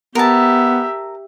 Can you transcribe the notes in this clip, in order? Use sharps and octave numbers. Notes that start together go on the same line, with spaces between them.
B3 G4 A#4 E5 A5